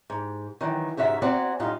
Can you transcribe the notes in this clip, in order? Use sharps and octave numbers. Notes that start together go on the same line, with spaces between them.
G#2
D#3 E3 F#3
G#2 C#3 F#4 E5 A#5
C4 F#4 D5 F#5 G#5 A#5
F#2 A2 G3 D#4 F4